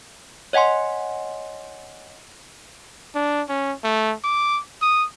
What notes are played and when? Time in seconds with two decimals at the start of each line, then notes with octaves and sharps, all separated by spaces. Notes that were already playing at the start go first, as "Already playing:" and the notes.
0.53 C#5 D#5 F#5 G#5 C6
3.15 D4
3.49 C#4
3.84 A3
4.24 D6
4.82 D#6